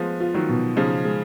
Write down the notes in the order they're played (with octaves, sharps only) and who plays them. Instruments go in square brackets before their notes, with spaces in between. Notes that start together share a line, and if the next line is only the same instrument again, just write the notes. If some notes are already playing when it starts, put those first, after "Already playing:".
Already playing: [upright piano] F3 G#3 B3
[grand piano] F4
[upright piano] D#3 F#3
[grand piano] B2
[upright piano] C#3 F3 [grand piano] D#4
[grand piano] G#3